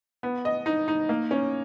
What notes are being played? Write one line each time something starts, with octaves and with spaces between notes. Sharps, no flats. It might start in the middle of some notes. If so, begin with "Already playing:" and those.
B3
D#5
D#4
D#4
A#3
C#4